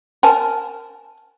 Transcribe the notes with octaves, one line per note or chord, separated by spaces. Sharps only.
A#4 G#5 A5